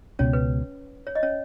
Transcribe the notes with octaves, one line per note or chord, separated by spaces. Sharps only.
C#2 B2 B3 C#4 C#5
B4
C#5
D#5
C#4 C#5